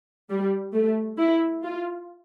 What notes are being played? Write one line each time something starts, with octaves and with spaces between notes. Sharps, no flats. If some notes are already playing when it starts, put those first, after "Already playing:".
G3
A3
E4
F4